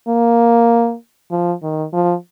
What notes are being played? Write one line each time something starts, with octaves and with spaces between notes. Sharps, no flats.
A#3
F3
D#3
F3